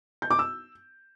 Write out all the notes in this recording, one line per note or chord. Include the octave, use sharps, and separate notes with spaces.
G6
D6
E6